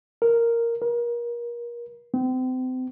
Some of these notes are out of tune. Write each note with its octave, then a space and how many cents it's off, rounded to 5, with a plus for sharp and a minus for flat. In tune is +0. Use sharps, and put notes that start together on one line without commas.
A#4 -5
A#4 +30
C4 -35